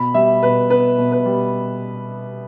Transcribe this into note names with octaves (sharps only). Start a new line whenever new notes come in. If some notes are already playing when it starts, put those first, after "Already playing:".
Already playing: B2 B5
G3 E5
B2 B4
B3 B4
B2
B4
G3